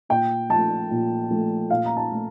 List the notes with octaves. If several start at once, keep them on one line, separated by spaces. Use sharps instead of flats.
A#2 G5
F3 A3 A5
A#2
F3 A3
A#2 F5
A#5
A5
A3